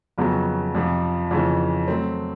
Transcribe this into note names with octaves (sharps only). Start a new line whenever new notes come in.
F2 C#3 F#3 B3
F2 C3 F3
F2 C#3 E3
F#3 A3 C4